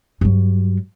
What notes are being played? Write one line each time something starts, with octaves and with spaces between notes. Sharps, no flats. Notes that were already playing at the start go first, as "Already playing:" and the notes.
G2 F#3